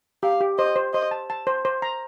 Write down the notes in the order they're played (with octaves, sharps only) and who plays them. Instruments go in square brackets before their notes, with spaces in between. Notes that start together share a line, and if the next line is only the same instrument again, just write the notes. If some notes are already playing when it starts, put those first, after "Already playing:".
[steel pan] G4 [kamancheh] F5
[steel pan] G4
[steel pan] C5 [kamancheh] D#5
[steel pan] C5
[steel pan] C5 [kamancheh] D#5
[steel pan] A5
A5
C5
C5
A#5